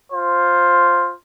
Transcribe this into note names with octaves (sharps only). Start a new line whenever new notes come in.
F4 C5